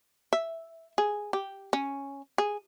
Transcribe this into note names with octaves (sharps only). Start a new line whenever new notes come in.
E5
G#4
G4
C#4
G#4